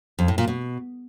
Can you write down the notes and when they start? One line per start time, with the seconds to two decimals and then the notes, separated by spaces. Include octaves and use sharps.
0.19 F2
0.28 A2
0.38 A#2
0.48 B2